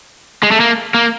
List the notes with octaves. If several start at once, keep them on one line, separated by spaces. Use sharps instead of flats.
G#3
A3
A#3
A#3